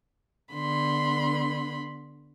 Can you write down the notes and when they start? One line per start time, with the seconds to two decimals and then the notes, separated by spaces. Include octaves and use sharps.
0.53 D3 B3 B5 C6